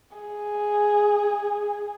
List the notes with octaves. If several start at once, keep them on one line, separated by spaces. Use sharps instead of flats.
G#4